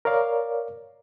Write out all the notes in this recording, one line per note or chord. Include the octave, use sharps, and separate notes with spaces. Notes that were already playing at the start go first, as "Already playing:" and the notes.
A#4 C#5 D5 F5